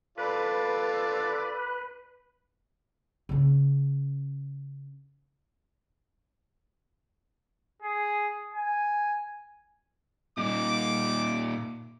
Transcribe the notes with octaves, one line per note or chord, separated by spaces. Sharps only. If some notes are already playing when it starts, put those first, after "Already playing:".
F4 A4 B4 D5
C#3 C#4
G#4
G#5
A#2 D#4 D6